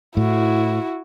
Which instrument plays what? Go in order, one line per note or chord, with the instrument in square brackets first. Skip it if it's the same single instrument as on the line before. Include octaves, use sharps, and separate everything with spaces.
[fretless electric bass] A2 [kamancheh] E4 F#4